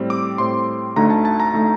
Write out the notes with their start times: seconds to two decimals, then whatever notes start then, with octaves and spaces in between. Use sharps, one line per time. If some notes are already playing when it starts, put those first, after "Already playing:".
Already playing: A2 G3 C4
0.10 D6
0.38 A2 G3 C4 C6
0.96 D2 D3 A3 D#4 A#5
1.10 A5
1.25 A5
1.40 A#5
1.54 D3 A3 D#4